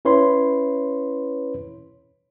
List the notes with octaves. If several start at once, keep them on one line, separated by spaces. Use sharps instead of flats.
C#4 E4 B4 C#5 B5 C6